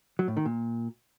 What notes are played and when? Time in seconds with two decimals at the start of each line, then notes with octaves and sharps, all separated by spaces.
0.19 F#3
0.28 A2
0.37 D#3
0.45 A#2